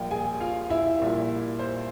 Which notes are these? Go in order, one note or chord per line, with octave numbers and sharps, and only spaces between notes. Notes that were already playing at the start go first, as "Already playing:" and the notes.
Already playing: A#1 A#2 G3 A#3 G4 G5
G#4 G#5
F4 F5
E4 E5
A#1 A#2 G3 A#3
C5